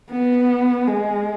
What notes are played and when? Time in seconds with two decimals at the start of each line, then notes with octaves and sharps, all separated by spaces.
0.11 B3
0.88 G#3